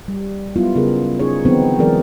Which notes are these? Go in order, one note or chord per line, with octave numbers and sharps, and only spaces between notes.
G3
F#3 G3 B3 E4 F4
C#3 B3 G#4 A#4
C#4 D#4 G#4 C#5
D3 E3 F#3 B3 C4 D#4
E3 F#3 G#3 G#4 A#4 D5